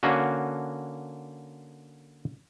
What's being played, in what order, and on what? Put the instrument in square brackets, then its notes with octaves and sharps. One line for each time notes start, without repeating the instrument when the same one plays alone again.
[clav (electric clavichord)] D3 A#3 C#4 F#4